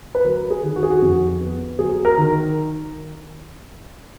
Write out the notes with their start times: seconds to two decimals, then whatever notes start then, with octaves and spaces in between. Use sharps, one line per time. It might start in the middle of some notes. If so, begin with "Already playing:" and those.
0.15 B4
0.24 F#3 A#4
0.50 G#4
0.63 D#3
0.76 F#4
0.83 G#4
0.90 F#4
1.02 F2
1.41 B3
1.79 F#3 G#4
2.05 A#4
2.17 D#3